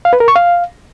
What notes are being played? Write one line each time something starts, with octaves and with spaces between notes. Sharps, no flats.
F5
B4
A#4
C#6
F5